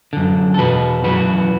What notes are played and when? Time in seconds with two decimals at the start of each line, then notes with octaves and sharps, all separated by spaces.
0.13 F#2 D3
0.54 A4
0.58 E2 B2 F#4 B4
1.04 F#2 E3 F#4 B4